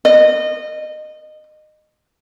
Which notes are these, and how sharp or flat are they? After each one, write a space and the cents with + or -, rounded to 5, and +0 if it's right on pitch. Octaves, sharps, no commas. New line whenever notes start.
D#5 -25